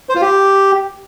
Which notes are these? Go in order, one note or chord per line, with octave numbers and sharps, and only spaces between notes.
C5
F4
G4